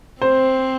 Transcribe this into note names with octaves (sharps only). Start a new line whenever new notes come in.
C4 C5